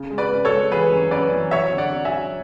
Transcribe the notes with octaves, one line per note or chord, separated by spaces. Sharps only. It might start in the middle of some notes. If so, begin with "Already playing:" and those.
Already playing: C#3
G#3
B4 D5
C#3
A4 C#5
G#3
E3 G#4 B4
F#2
F#2 B4 D5
E3
F#3 C#5 E5
D3
D5 F#5
F#3
E5 G#5
F#3